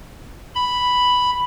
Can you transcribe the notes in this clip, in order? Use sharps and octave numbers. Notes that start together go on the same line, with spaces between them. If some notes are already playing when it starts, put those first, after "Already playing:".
B5